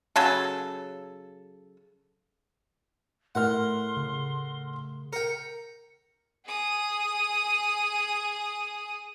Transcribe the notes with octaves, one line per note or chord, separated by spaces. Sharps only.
C#3 F#3 A4
A2 A#4 F#5 C6 F6
C#3
A#4 G5 C#7
G#4 D#6